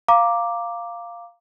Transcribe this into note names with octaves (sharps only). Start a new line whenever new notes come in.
F5 A#5 D6